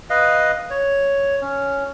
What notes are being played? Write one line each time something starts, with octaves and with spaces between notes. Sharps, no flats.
B4 D#5 F5
C#5
C#4